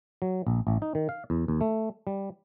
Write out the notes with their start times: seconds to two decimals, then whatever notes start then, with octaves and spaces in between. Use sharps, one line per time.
0.22 F#3
0.47 A#1
0.67 A1
0.82 D#4
0.95 D#3
1.09 F5
1.30 E2
1.48 D#2
1.61 A3
2.07 G3